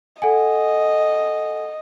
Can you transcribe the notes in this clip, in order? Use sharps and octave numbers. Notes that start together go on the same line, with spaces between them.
A4 D#5 F#5 G#5